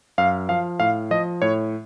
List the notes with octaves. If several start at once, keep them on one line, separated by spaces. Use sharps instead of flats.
F#2 F5
F3 F5
A2 F5
F3 D#5
A2 C#5